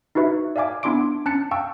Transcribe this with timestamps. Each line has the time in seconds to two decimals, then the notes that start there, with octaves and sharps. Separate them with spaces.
0.15 D#4 E4 F#4 B4 E5
0.56 D5 E5 F5 G#5 D6
0.83 B3 D4 E4 C6 D6 D7
1.26 C#4 A5 F#6 A6 C#7
1.51 F5 G5 A5 C#6 E6